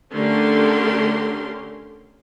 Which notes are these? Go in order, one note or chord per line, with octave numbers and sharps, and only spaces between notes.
D3 A3 C#4 G4 A#4 C6